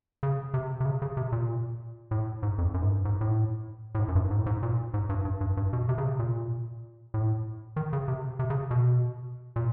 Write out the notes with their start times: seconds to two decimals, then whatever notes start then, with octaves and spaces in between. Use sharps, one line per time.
0.23 C#3
0.54 C3
0.80 C3
0.85 C#3
1.02 C#3
1.17 C3
1.32 A#2
2.11 A2
2.43 G#2
2.58 F2
2.74 F#2
2.82 G#2
2.89 G2
3.05 G#2
3.21 A2
3.95 A2
3.99 G#2
4.08 F#2
4.15 G2
4.31 G#2
4.39 A2
4.46 G#2
4.63 A#2
4.94 G#2
5.09 G2
5.25 G2
5.41 G2
5.57 G2
5.73 B2
5.89 C3
5.98 C#3
6.04 C3
6.19 A#2
7.14 A2
7.76 D#3
7.93 C#3
8.08 C3
8.39 C3
8.50 C#3
8.71 B2
9.56 A#2